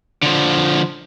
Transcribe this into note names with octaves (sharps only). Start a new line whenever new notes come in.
D3 F3